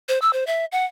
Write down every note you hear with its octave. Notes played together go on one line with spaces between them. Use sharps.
C5
E6
C5
E5
F#5